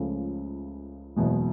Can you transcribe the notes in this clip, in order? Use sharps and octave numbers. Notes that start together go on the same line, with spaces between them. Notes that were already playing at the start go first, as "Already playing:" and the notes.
Already playing: C#2 C#3 F3 A3
F#1 E2 B2 G#3